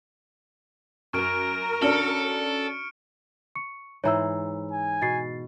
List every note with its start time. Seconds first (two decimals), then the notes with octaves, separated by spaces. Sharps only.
1.13 F#2 A#4 C#6 F6 D7
1.82 C#4 D4 F#4 A4 F6 C#7 D7
3.55 C#6 C#7
4.04 G#2 E3 C5 C#5 A#5 E6
4.72 G#5
5.02 B2 A6 C7